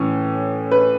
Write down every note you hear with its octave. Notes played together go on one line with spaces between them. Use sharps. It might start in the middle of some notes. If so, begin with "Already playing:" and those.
Already playing: A2 E3 C#4
B4